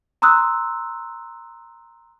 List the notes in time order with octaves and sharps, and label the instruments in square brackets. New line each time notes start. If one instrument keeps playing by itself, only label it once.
[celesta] A#5 C6 D#6 E6 F#6